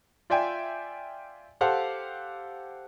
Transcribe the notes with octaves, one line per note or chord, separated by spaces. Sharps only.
F4 D5 E5 G5 G#5
G4 A4 C5 F5 F#5